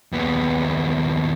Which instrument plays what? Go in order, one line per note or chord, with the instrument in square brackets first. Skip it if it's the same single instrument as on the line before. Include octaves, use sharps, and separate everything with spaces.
[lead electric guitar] D#2 B3